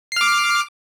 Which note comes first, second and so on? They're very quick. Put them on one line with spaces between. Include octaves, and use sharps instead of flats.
C7 F6 D6